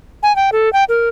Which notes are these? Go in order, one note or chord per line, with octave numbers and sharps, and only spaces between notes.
G#5
G5
A4
G5
A#4